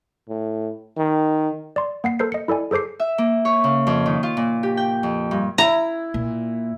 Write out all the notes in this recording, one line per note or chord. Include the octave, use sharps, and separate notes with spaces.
A2
D#3
D5 C6
A#3 F#5 C7
A4 A#4 C5 C7
D#5 C#7
E4 A4 D5 G#5
G#4 A4 C5 D6 C7
E5
A#3
C#5
C#3
F2
D#3
F4
A#2
G4
G5
F2
G2
E4 A#5
A#2